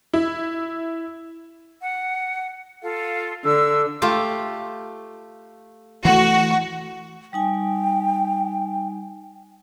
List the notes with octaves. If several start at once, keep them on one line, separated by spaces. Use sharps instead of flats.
E4
F#5
F4 A4 F5
D3 E6
A3 F4 G4
E3 A3 F#4
G3 D#4 G5 G#5